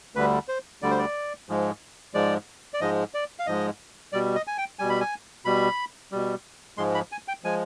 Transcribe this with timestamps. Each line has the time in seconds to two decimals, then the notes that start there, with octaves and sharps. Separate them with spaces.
0.15 D2 D3 G3 B4
0.48 C5
0.82 D2 D3 G3 D5
0.91 C5
0.98 D5
1.49 G#2 F3 G#3
2.14 G#2 F3 G#3 D5
2.74 D5
2.81 G#2 F3 G#3 D#5
3.14 D5
3.39 F5
3.47 G#2 F3 G#3 D#5
4.13 B2 G3 D5
4.35 D#5
4.47 G#5
4.58 G5
4.79 B2 G3 G#5
4.90 B5
5.01 G#5
5.45 B2 G3 B5
6.12 B2 G3
6.78 G#2 F3 G#3 C6
6.95 B5
7.12 G#5
7.28 G5
7.44 F3 G#3 G#5